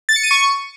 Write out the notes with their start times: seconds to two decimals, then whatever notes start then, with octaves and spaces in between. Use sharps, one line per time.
0.09 A6
0.16 C#7
0.23 D#7
0.31 C#6